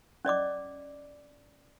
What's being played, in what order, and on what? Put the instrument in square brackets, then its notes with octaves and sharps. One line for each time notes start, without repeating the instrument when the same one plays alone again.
[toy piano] C#4 D5 D#5 D6